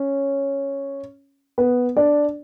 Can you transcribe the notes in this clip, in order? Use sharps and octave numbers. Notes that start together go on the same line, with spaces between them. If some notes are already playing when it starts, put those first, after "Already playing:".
Already playing: C#4 C#5
B3 B4
D4 D5